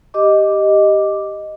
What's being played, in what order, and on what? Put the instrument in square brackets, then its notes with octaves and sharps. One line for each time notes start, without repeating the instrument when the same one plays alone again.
[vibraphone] G4 D#5 D6